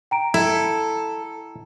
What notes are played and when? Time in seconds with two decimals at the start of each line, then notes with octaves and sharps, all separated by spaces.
0.11 G5 A#5 D7
0.34 E4 A4